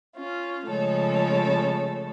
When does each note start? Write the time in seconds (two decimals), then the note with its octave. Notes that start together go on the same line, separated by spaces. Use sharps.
0.15 C#4 F4
0.69 C#3 F3 G#3 A3 A4 C#5